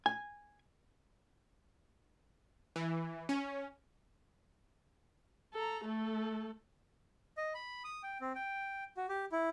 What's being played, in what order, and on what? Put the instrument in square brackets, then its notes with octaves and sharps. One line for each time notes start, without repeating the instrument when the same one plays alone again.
[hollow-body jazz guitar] G#5
[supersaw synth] E3
C#4
[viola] A4 A#5
A3 A4
[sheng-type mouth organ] D#5
B5
D#6
G5
C4
G5
F#4
G4
E4